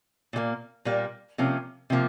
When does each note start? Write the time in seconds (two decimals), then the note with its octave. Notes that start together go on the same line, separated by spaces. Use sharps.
0.33 A#2 G3 A#3
0.85 A#2 G3 A#3
1.38 C3 F3 A#3 C#4
1.90 C3 F3 A#3